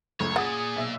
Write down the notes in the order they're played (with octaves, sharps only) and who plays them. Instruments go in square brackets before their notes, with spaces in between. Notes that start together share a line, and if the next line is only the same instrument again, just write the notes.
[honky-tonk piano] C#2 F#2 A3 [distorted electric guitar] C#5
[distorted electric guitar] A#2 [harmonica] G#4 [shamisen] F#5 [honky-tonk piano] D#6 A6
[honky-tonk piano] B1 E5 E6